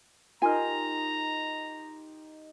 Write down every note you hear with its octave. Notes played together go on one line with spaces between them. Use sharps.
D#4 F4 G4 A#4 G#5 A#5 C6 F6